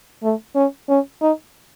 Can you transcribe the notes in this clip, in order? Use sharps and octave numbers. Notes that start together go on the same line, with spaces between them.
A3
C#4
C#4
D#4